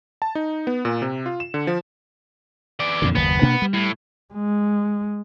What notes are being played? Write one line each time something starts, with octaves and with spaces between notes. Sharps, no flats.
A5
D#4
B3
A#2
C3
F4
E7
D3
F3
E3 D5
F2 A#2 D3
F#1 D#2 B3
B2 A#3 D4
G3
A2
G#3